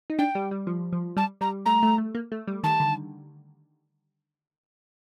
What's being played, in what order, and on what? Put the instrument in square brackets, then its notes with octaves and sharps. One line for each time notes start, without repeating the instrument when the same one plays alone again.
[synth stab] D#4
[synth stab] D4 [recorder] G5
[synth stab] G3
G3
F3
F3
[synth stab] G3 [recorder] A5
[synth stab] G3 [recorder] A#5
[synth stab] A3 [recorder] A#5
[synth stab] A3
A3
A#3
A3
G3
[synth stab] D#3 [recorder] A5
[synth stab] D3